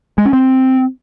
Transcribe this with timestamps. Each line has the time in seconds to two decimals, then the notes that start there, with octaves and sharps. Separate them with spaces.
0.18 G#3
0.25 C#4
0.33 C4